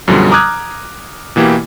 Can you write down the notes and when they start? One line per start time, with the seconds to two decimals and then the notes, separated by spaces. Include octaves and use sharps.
0.08 F#2 B2 D3 F3 G3
0.31 A#5 D6 D#6 F6 F#6 G#6
1.36 B2 E3 A#3 E4 G4